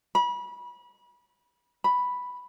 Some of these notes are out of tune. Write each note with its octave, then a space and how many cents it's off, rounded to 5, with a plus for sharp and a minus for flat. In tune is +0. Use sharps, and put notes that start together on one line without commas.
B5 -30
B5 +0